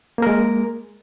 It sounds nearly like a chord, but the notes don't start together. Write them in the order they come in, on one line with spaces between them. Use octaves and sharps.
A#3 A#4 G#3